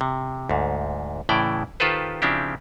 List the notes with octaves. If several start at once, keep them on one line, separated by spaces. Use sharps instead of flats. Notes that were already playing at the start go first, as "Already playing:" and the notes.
C3
D2 G#2
A2 C#3 E3 E4 D5 G5
D#3 F4 G4 A4 B4 C5
C#3 F3 C4 D4 E4 G4